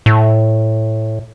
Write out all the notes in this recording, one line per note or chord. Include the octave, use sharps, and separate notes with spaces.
A2